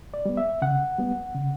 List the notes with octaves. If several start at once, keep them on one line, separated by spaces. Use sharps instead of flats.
D5
G3 B3
E5
C#3 F#5
G3 B3
C#3